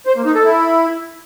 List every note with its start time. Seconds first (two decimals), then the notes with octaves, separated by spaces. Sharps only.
0.06 C5
0.16 A#3
0.26 D#4
0.35 A4
0.45 E4